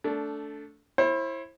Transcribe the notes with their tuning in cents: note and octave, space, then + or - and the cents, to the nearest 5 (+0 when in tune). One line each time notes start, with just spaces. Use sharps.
A3 +0 D4 -20
E4 +5 C5 +40